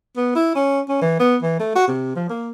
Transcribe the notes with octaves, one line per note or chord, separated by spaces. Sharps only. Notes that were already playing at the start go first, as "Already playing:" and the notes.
B3
E4
C#4
C#4
E3
B3
E3
A3
F#4
C3
F3
A#3